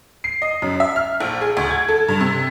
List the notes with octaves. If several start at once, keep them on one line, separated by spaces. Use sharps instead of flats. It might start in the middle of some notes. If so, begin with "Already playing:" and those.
C7
D#5
F#2
E5
F6
A#1
G#4
D2
G#6
A4
G2
C3